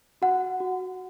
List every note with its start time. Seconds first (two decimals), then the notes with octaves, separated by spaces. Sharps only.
0.22 F#4 F#5
0.60 F#4